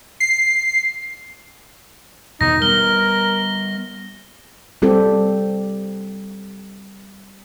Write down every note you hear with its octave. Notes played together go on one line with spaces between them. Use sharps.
C7
E2 B2 D#3 D#4 A#6
G3 A#3 B3 A#4 G7
G3 C4 G4 A4